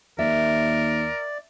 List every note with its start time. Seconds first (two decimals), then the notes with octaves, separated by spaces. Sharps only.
0.19 D#2 A#4 D5 E5